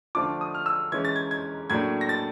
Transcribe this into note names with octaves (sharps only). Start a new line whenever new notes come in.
D3 F3 A3 D4 F4 D6
D#6
F6
E6
E3 G#3 C#4 G#6
A6
G#6
G#6
A2 F#3 A#3 D4 G#6
A#6
A6